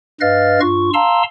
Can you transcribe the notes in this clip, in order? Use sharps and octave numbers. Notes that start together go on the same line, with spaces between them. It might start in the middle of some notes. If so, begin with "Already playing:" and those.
G2 B4 D#5 F5 F6 A6
G2 F4 C#6
F5 A5 A#5 C6 E6